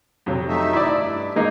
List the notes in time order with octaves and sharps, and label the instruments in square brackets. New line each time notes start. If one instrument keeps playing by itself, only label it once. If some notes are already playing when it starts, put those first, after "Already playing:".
[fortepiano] F2 C3 F#3
[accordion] A3 D#4 E5
[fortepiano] E4 D5
[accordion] G2
[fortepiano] G#3 A#3 D#4